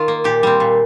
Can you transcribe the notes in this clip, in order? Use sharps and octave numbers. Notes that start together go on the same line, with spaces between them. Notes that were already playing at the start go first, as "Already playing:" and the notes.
Already playing: D#3 F4
A#3
A#2 G4
G3 C4
A#2